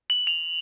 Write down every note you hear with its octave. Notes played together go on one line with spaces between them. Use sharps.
F#7
F7